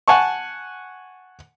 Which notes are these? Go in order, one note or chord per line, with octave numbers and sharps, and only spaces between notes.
F#5 G#5 A5 C#6